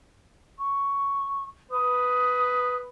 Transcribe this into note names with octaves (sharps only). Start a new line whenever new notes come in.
C#6
B4 D#6